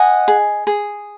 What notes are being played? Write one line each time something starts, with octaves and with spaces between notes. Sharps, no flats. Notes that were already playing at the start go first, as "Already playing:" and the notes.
Already playing: D#5 F#5 G#5
G#4
G#4